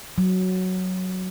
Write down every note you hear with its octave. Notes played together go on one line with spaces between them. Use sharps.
F#3